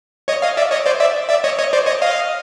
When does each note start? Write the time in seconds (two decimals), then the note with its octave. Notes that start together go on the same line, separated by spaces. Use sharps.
0.28 C#5 D#5
0.42 D#5 F5
0.57 D5 E5
0.71 C#5 D#5
0.86 C5 D5
1.00 D5 E5
1.29 D5 E5
1.44 C#5 D#5
1.58 C#5 D#5
1.73 C5 D5
1.86 C#5 D#5
2.02 D#5 F5